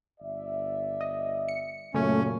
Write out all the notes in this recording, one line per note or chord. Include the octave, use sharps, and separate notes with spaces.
G1 D5 E5
D#5
C#7
F#2 A#2 C#3 A3 C#4 C#5